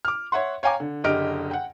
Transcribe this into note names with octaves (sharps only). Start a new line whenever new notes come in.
D6 F6
C#5 E5 F#5 C6
C#5 F5 G5 G#5 A#5 D6
D3
F#1 D3 G4 D#5 F6 D7
F#5 G5